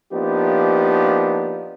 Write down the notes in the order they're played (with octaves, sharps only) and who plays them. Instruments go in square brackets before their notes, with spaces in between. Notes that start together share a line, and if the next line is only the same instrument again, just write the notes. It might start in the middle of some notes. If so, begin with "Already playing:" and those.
[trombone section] F3 A#3 B3 D4 D#4 G4